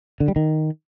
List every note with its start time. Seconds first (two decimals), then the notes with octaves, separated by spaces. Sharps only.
0.20 D3
0.28 G3
0.36 D#3